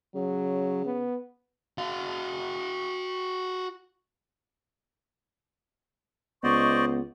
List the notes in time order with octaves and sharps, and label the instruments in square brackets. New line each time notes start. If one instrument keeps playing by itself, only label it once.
[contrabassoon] C#3 [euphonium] F#3
[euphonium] B3
[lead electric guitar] F#4 F5
[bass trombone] C#2 [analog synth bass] B3 [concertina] C5 D5 D#5 [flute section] C#6